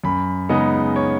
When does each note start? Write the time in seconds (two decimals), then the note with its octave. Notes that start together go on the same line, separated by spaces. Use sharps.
0.04 F#2 B5
0.49 C#3 G#3 B3 D#4 D#5
0.96 C#5